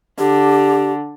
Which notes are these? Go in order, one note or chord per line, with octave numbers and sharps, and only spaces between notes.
D3 G4